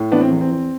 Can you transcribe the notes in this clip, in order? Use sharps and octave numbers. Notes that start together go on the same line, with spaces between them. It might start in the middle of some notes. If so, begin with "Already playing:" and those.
Already playing: A2
E3 B3 D4
C4
E2
C4
E2 C4